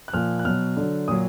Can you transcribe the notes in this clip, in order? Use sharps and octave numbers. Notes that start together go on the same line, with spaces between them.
F#6
A#2 F3 F6
F#6
B2 F#3 F6
D3 F#3
A#2 F#3 D#6